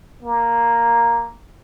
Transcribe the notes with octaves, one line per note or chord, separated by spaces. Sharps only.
A#3